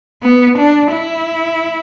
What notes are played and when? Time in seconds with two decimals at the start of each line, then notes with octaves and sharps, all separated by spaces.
0.23 B3
0.58 D4
0.93 E4